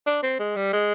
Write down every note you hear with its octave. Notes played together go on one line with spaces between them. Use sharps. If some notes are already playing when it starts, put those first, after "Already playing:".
D4
C4
G#3
G3
G#3